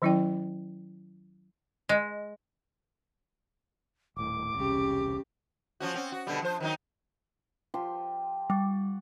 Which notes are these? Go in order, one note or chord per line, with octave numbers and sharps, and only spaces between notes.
D#3 F#3 C#4 E4 D5 G5
G#3
D#1 A2 D6
E1 C2 C#3 G4
F3 C#4 F#4
C4 C#4
F#4
B2 D3 G3
F3 C5
D#3 F#3 D#4
F3 G4 C6
G3 F#5